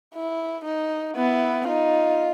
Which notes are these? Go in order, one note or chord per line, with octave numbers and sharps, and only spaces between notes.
E4
D#4
B3 E4
D#4 F4